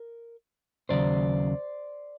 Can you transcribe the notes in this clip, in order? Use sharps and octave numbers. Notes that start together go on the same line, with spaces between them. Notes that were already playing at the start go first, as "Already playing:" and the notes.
Already playing: A#4
D#2 C#3 F#3 C5 D5